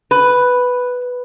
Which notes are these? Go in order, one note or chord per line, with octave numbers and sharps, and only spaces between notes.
B4